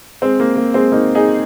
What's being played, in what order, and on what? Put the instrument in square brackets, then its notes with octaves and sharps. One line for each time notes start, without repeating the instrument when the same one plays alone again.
[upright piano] G#3 C4
A#3
A#3
G#3 C4
A#3 D#4
D#4 G#4